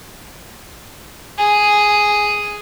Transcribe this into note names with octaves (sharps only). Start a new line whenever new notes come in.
G#4